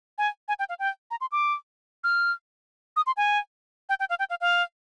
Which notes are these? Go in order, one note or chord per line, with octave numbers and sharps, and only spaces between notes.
G#5
G#5
G5
F5
G5
A#5
C6
D6
F6
D#6
C6
G#5
G5
G5
F5
G5
F5
F5